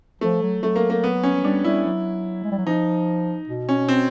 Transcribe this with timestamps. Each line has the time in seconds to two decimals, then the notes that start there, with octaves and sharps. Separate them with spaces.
0.21 F3 A3
0.42 F#3
0.62 F#3 A3
0.76 A#3
0.90 A#3
1.04 B3
1.23 C#4
1.36 F#3
1.43 G3 D4
1.64 G3 E4
1.85 F#3
2.43 G#3
2.51 G3
2.58 F#3
2.66 F3 D#4
3.47 B2
3.69 C#4
3.88 C4